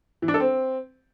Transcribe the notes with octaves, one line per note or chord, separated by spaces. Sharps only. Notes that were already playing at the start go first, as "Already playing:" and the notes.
E3
D4
A4
C4